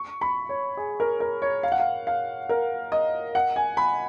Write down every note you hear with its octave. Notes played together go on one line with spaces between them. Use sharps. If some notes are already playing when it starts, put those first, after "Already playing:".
Already playing: C#6
B5
C#5
G#4
A#4
A#4
C#5
F5
F#5
F5
F5
A#4
D#5
F#5
G#5
B5